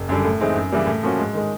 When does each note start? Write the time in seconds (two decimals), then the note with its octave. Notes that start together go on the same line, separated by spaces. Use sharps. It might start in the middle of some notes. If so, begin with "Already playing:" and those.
Already playing: F#1
0.09 F#2 D3 G3
0.25 A2
0.41 E3 G#3 C4 D#4
0.55 F#2
0.72 C#3 E3 G3 A#3
0.87 A2
1.03 F3 A#3 C#4 F#4
1.19 G#2
1.34 D#3 G#3